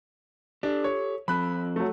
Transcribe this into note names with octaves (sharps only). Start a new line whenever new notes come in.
D4 G4 A4
C#5
F3 C4 A4 B5 F#6
F#3 A3